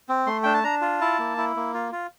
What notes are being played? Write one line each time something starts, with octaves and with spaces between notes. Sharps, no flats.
C4
A3 C6
D4 G5
A5
D4 A#5
F4
E4 A5
A#3
E4
A#3
F4
F4